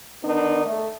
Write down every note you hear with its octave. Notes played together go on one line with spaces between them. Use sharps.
D3 D#3 B3 D4 D#4
A3